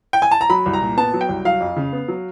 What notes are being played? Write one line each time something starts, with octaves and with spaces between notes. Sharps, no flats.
G5
G#5
A5
A#5
F#3 B5
C2
A#5
A#2
B3 A5
F#3
G5
C2
F#3 F5
F2
C#3
B3
F#3